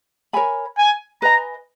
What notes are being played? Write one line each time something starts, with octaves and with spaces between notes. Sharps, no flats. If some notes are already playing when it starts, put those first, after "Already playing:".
A#4 C#5 G#5 B5
G#5
B4 D#5 G#5 A#5